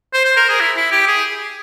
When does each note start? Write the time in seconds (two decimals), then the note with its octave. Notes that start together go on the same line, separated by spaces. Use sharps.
0.14 C5
0.25 C5
0.37 A#4
0.49 G#4
0.60 E4
0.77 E4
0.92 G4
1.07 G#4